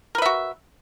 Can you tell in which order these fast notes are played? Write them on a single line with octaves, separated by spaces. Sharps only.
A#4 B4 E5 F#4